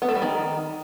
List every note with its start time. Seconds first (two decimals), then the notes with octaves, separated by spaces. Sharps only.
0.02 B3
0.08 A3
0.15 G3
0.22 D#3